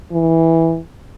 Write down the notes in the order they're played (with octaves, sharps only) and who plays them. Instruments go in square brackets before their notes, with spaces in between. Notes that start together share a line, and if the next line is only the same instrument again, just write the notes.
[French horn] E3